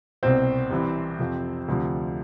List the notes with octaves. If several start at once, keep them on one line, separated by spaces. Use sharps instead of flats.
C2 B2 C4 C5
C2 C3 E3
F2 C3 F3
D2 C3 F3